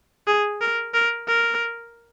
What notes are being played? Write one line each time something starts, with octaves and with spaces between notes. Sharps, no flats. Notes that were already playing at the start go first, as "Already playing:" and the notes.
G#4
A#4
A#4
A#4